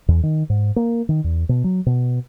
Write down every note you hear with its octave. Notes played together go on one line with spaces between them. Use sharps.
E2
D#3
G#2
A#3
D#3
E2
B2
F#3
B2